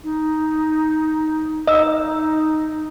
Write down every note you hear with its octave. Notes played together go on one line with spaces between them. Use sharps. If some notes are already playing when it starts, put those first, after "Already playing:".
D#4
D#4 D#5 E6